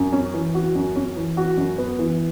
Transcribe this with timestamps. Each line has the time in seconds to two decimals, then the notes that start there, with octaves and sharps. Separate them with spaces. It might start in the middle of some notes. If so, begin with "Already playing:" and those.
Already playing: F#2
0.13 C#4
0.34 E3
0.54 F#4
0.75 F#2
0.96 C#4
1.16 E3
1.37 F#4
1.57 F#2
1.78 B3
1.99 E3